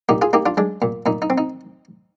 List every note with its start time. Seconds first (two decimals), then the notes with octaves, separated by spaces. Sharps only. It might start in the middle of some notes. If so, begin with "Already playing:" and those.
0.09 A#2 D#4 G4
0.22 F4 G#4
0.33 A#3 D#4 G4
0.46 D4 F4
0.57 G#3 D4
0.82 A#2
1.06 A#2 D#4
1.22 D#4
1.30 C4
1.38 D#4